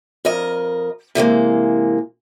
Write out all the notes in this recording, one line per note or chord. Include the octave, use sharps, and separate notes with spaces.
F2 A#4 D#5
C3 E3 G#3 A#3